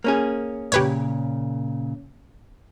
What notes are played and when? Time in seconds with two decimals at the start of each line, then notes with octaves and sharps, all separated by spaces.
0.04 A#3 C#4 G#4
0.72 A#2 C#3 G4 B4 C#5